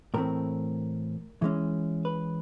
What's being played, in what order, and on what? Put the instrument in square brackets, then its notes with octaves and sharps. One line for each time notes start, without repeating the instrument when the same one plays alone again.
[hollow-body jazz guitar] A2 E3 A3 C4 A#4
E3 G#3 C#4
B4